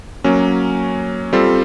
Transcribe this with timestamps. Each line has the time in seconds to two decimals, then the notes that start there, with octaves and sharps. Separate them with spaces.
0.24 F#3 A#3 C#4
1.33 G3 C4 F4 A4